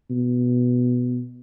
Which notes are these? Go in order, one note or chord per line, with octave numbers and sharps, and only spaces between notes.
B2